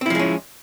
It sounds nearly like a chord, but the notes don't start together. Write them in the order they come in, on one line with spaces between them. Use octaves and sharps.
C4 E4 F3 G#3 C#4